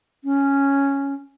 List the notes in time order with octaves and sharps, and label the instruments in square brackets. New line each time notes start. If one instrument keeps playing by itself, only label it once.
[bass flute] C#4